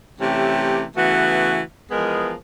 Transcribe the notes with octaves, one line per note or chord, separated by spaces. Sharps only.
C3 E3 A3 C#4 G4
C#3 E3 A3 B3 F#4
E3 F3 G#3 B3 G#4 A#4